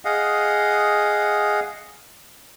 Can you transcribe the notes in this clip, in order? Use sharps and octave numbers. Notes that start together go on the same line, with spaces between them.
G#4 D#5 F5 F#5